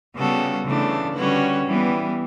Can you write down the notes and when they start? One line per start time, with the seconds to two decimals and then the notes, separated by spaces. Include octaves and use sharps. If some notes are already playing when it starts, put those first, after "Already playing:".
0.15 C#3 G3 B3 F#4 A4
0.65 C#3 E3 A3 D4
1.15 D3 G3 C#4 F#4 B4
1.66 E3 G3 B3